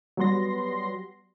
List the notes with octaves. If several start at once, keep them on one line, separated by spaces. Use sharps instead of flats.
F#3 G3 B3 C6 A#6